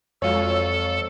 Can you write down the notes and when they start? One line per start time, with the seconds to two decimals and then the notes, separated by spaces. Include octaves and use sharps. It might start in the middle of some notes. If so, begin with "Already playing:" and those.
0.22 F2 F#3 G#3 F4 A4 C#5